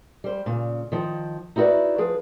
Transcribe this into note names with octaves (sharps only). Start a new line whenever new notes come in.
G3 C5
A#2 C#3
D#3 F3
D#4 E4 F#4 A4 B4 D5
F3 G#4 B4